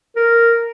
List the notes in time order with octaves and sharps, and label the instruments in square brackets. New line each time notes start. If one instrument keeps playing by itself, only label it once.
[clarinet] A#4